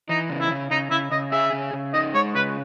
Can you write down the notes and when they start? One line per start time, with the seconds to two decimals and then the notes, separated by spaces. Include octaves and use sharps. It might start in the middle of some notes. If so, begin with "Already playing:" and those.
0.09 E3 D#4
0.30 C#3
0.40 E4
0.51 C#3
0.71 C#3 D#4
0.91 C#3 E4
1.11 C#3 D#5
1.32 G#4 E5
1.53 C#3
1.73 C#3
1.94 D#4 D#5
2.14 G#3 C#5
2.35 C#3 B4